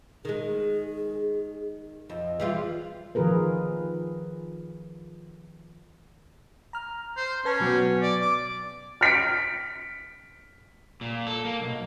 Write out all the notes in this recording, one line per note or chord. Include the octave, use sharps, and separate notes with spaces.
D#3 G#3 G#4
F2 D#5
E3 G3 F4 G#4
D#3 F3 F4 G#4 A#4 B4
A#5 F6
C5
C#4 B4 A5
B2 F#3 B3
D5
D6
F6 B6 C#7 D7
A#2
A4
A#3
B1